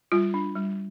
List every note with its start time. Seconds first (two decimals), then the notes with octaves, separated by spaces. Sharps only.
0.12 G3 F4
0.34 D4
0.55 G3